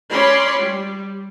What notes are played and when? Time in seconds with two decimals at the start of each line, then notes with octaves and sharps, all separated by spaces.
0.11 C#4 C#5 D5 B5 C6
0.58 G3